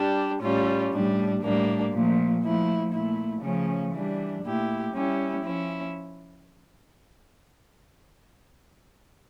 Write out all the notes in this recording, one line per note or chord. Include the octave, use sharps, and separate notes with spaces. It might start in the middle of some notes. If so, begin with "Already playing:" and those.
Already playing: G3 D4 G4
A2 G3 C#4 F4
A2 G3 D4
A2 G3 A#3 D4
A#2 F3 A3
F3 A3 E4
A#2 A3 E4
C#3 F3 A3 C#4
E3 G3 D4
A#2 A3 E4 G4
G3 C#4 E4 G4
F3 C#4 E4